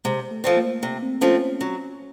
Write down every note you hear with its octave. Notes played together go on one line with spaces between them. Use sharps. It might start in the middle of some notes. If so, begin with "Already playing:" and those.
C3 G#3
A3
F3 A3 C4
A#3
C3
C4
F3 A3 C4 C#4
F#3 C#4